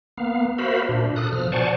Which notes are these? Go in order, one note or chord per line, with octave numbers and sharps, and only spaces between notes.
A#3 B3 F5
F#4 A#4 C5 E5 F5 B5
A#2 D4
A4 D#6 F#6
B2 F3 F6
C5 D5 F#5 G#5 A5 C#6